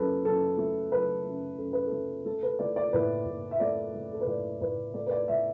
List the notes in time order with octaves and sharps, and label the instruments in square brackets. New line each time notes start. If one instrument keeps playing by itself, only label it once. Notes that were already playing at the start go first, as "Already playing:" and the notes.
Already playing: [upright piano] F#2 F#3 A4 B4
F#2 A4
A3
F#3 B4
F#2
F#2 A4
B4
A4
A3
A3 A4
B4
A3 D5
D5
A2 B4
A2
E5
A3 D5
A3
A4
B4
A2 D5
A2 B4
A3 D5
B4
D5
A3 E5